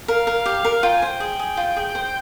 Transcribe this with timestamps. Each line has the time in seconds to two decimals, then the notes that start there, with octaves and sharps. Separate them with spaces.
0.08 A#4 F5
0.27 A#4
0.46 G4
0.65 A#4
0.83 F4 G5
0.95 G#5
1.02 C5
1.07 G5
1.20 G#4
1.39 G#4
1.57 F4
1.76 G#4
1.95 C5